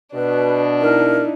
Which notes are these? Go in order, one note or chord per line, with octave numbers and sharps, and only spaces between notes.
B2 D4 B4
D#4 E4 A#4